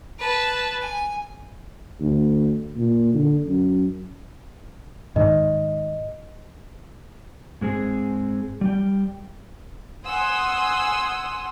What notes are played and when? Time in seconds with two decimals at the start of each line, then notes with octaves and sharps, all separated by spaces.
0.19 B4 A5
0.81 G#5
2.00 D2
2.76 A#2
3.14 D3
3.46 F#2
5.16 G#2 D#3 D#5
7.61 G#2 G#3 C4 G#4
8.61 G3 G5
10.07 F#5 G#5 C6 D#6 E6